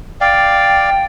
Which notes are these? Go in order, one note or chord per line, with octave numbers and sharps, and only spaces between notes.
D5 F5 G5